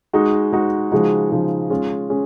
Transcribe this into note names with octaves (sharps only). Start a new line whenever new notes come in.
G#3 D#4 F#4
G#3 D#4 F#4
C#3 F3 G#3 D#4 F#4
C#3 F3 G#3 D#4 F#4
G#3 C#4 F4
G#3 C#4